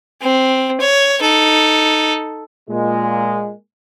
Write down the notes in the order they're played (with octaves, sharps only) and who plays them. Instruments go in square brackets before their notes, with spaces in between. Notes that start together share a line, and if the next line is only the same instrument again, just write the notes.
[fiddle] C4
C#5
D#4 A4
[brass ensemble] A#2 G#3